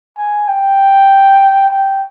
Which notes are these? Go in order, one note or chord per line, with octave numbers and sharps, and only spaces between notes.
G#5
G5
G5